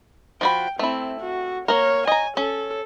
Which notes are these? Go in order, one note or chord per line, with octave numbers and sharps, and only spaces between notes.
F3 F#4 G5 B5
A3 C4 E4
F#4
A#3 A#4 C#5
D#5 G#5 A#5
C#4 A4